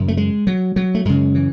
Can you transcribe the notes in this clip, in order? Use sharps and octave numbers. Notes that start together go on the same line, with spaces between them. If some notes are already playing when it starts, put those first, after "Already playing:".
Already playing: F#2 C#3
A3
G#3
F#3
F#3
A3
F#2 C#3 G#3
E3